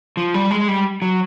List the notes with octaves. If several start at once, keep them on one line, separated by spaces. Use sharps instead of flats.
F3
G3
G#3
G3
F#3